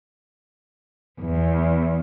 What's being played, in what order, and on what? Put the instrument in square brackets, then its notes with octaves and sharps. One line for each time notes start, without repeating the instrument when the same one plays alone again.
[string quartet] E2